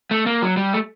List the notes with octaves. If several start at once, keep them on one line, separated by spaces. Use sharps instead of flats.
A3
A#3
F#3
G3
A3